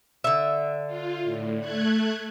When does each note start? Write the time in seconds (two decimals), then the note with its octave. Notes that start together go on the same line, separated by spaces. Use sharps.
0.24 D3 E5
0.87 F4
1.23 A2
1.60 A3 F#6 G#6